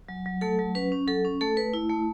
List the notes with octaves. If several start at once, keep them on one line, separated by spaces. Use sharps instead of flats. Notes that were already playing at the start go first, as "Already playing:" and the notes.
F#3
F#3
A3 A4
F#3
C#4 B4
C#4
F#3 A4
C#4
A3 A4
A3 B4
E4
A3